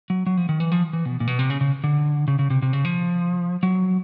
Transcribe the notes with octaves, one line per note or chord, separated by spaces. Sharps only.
F#3
F#3
F3
D#3
E3
F3
E3
B2
A#2
B2
C3
C#3
C#3
D3
C#3
C#3
C3
C3
C#3
F3
F#3